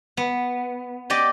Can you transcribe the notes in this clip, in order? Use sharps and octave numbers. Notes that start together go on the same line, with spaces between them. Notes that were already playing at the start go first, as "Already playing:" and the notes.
B3
G4 D5 D#5